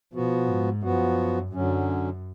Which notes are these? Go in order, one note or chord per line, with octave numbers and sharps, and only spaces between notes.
B2 F3 B3 F#4
G#2
F#2 F3 B3 F#4
F#2 D3 F#3 C#4